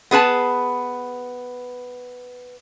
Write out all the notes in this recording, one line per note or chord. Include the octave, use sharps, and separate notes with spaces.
B3 G#4 B4 A5